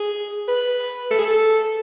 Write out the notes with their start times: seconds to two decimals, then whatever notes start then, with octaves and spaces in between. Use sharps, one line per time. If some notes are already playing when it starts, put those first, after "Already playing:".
Already playing: G#4
0.48 B4
1.11 A4
1.18 G#4
1.25 A4